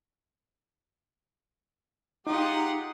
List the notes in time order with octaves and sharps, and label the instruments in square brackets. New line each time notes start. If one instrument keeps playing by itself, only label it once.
[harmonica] G#3 G4 D#6 [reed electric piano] D#4 [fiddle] F4 F#5 [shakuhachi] A#5